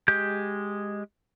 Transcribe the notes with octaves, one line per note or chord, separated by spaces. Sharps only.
G#3 G4 G6